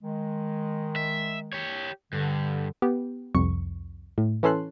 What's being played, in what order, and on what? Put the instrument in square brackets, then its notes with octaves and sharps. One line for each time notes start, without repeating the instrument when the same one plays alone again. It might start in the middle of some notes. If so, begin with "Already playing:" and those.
[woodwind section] D#3 G#3
[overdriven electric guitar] E5
G4 C#5
[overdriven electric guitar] G2 [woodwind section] D3
[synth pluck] B3 G4
C2 F2 C#6
A2
E3 C#4 A4 C6 F#6